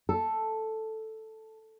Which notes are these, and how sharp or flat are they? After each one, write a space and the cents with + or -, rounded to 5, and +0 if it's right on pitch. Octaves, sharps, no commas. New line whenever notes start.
A4 +0